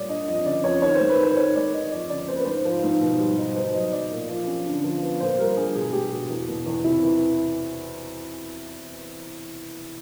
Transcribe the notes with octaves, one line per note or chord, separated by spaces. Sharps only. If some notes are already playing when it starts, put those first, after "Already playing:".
Already playing: A#2 G3 C#5 D5
D4 D#5
F2 D#5
C#3 D5
F2 C#5
D#3 C#5
G#3 C5
B4
D#3 C5
D#3 C#5
G#3 D5
D#3 D#5
F2 D5
C#3 D5
A#3 C5
B4
G#2 C5
F3
G#2
B2
G3
D#4
B2 C5
F#3 D#5
B2 D5
A#2
F3
C#4
D3
F3
B3
A#2 C5
G3 A#4
D4 G#4
B2 G#4
G#3 G4
B2 F#4
E2
B2
E2
C3 E4
E3